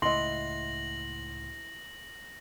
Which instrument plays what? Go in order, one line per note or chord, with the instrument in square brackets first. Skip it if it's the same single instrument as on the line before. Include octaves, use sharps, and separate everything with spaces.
[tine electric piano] C#2 A2 F#5 [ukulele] E4 D#5 [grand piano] C6 [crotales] A#6 F#7